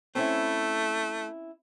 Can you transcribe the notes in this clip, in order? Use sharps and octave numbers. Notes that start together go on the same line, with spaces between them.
A3 C4 C#4 E4